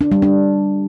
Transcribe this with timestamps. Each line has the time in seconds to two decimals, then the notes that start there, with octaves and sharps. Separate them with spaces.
0.01 D4
0.12 G3
0.22 D4